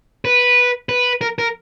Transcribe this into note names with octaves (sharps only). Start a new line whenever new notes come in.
B4
B4
A#4
A#4